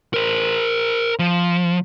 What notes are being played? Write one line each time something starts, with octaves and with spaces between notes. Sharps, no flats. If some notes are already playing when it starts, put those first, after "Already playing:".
A#4 C5
F3